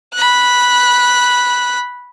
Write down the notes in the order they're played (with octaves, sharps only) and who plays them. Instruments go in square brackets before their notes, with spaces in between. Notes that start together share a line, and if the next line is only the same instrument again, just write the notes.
[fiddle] B5 F#6